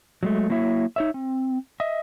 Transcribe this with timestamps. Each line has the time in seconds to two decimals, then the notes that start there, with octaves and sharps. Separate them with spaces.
0.23 F#3 G#3 A3
0.50 F#3 A#3 E4 C#5 E5
0.96 D#4 C#5 E5
1.14 C4
1.80 D#5 E5